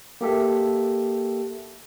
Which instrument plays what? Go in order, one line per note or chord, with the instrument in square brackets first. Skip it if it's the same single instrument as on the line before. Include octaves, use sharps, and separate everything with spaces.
[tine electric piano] A#3 G4 A4 E5